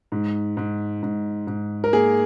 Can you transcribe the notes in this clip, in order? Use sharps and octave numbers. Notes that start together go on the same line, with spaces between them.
G#2
G#2
G#2
G#2
A#4
A#3 G#4